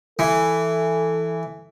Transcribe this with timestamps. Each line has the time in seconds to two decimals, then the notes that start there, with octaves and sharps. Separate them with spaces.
0.19 E3 A4